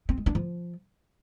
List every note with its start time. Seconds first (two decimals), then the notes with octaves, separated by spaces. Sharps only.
0.09 C4
0.18 G#3
0.26 D4
0.35 F3